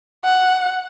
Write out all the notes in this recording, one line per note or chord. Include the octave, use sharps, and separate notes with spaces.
F#5